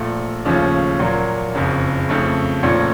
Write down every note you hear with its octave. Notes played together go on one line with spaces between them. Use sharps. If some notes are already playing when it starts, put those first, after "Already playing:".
Already playing: A#1 A#2 A3
D#2 C#3 F3 A3 C#4
A#2 F#3 A#3
F#1 F2 C#3
F2 C#3 A3
A#1 A#2 A3 C#4